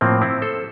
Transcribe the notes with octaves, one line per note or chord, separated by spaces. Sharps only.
A2 F3 A#3 C4
C4 E4
A4 C5